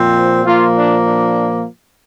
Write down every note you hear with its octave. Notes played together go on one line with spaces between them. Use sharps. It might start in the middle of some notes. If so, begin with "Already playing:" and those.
Already playing: A#2 F3 C4
A#2 F3 A#3 F4
D4
D4